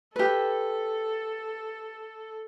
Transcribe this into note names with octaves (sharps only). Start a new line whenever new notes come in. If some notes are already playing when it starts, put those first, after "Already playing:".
G4 A4 B4